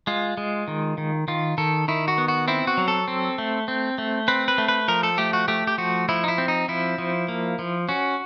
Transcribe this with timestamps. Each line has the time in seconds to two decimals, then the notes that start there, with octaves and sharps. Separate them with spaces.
0.07 G#3 F4
0.37 G#3
0.68 D#3
0.98 D#3
1.28 D#3 F4
1.58 D#3 A4
1.88 D#3 E4
2.08 F#4
2.18 B3
2.28 F#4
2.48 C4 E4
2.67 F#4
2.77 F#3
2.88 A4
3.08 C4
3.38 A3
3.68 C4
3.98 A3
4.28 C4 B4
4.48 B4
4.58 A3
4.68 B4
4.88 F3 A#4
5.03 A4
5.18 A3 G4
5.33 F#4
5.48 A3 G4
5.67 G4
5.78 F3 F#4
6.09 F3 E4
6.24 D#4
6.28 E4
6.38 C4
6.48 D#4
6.68 F3 E4
6.98 F3
7.28 A#3
7.59 F3
7.89 C#4 F#4